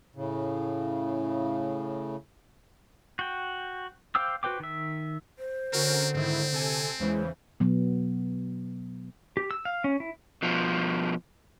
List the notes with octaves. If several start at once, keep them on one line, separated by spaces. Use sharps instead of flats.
A2 C#3
F#4 G5
C5 F5 G5 D6 E6
F#4 B4 C5 G5 D6
D#3 E5
C5
D3 C4 C#4 F#4 A#4
G#2 D#3 C4 E4
C3 A4 G#5
E2 C#3 E3 G#3 C5
B2 F#3 B3
G4
E6
F5
C#4
E4
B2 F3